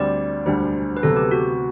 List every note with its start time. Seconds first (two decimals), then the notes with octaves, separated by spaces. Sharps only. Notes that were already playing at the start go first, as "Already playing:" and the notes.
Already playing: D2 D3 G3 C4 D5
0.46 E1 D2 D3 G3 D4 C5
0.97 B4
1.03 D2 C3 F#3 B3 A4
1.16 G4
1.31 F#4